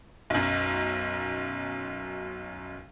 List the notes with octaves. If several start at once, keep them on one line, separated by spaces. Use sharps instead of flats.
B1 F#2